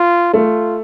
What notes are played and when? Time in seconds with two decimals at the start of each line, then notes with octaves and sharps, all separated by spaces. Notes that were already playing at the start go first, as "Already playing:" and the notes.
Already playing: F4
0.33 A3 F4